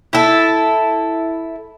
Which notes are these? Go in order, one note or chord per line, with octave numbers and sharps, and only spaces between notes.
E4 A4